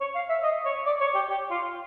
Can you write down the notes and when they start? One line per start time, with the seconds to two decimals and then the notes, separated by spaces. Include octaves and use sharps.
0.01 C#5
0.15 F5
0.29 E5
0.43 D#5
0.65 C#5
0.86 D5
1.01 C#5
1.15 G4
1.30 G4
1.51 F4